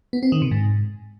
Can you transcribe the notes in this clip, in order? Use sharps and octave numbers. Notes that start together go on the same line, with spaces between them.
B3
C4
D#3
C3
G#2